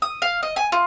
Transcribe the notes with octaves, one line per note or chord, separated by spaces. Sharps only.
D#6
F5
D#5
G#5
F4